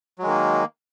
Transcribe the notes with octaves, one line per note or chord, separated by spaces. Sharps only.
D#3 F#3 G#3 A#3